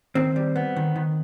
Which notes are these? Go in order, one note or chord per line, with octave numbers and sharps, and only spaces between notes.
D#3 C4
G3
B3
D#3
D#3